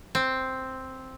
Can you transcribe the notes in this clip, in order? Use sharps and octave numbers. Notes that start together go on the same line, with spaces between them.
C4